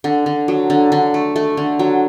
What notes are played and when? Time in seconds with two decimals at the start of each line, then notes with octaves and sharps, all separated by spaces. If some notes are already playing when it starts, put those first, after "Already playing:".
0.04 D3
0.26 D3
0.48 F#3
0.70 D3
0.92 D3
1.14 A3
1.36 A3
1.57 D3
1.79 F#3